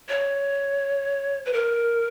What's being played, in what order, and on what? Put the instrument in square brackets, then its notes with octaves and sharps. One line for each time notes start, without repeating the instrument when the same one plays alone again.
[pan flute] C#5
B4
A#4